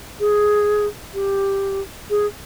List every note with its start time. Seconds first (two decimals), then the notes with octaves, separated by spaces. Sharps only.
0.20 G#4
1.14 G4
2.10 G#4